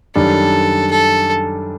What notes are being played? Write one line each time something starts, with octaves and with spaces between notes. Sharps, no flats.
F#2 D#3 G3 D4 A4
A4